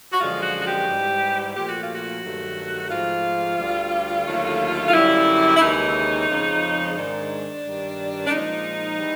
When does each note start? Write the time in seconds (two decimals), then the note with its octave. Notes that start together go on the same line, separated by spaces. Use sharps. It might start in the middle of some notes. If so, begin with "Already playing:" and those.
0.13 F#4
0.21 F#2 D3 F3 G#3 F4
0.43 F#4
0.60 F#4
0.65 G4
0.88 G#2 E3 G3
1.56 A#2 F3 A3 G4
1.69 F#4
1.82 F4
1.95 F#4
2.23 G2 D#3 F#3 A3
2.90 G#2 F3 A3 F4
3.58 D2 D3 G3
4.26 D#2 D3 F#3 A3
4.89 F4
4.94 F#2 D3 G3 E4
5.57 E4
5.61 D#2 C#3 E3 G#3 D#4
6.29 F2 C#3 F3 G#3
6.96 G#2 D#3 G#3 D4
7.63 G2 D#3 G3
8.27 D4
8.31 A#2 F3 G#3 D#4
8.99 E3 G3